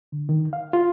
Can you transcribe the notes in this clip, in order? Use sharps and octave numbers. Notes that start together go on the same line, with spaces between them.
D3
D#3
F5
F4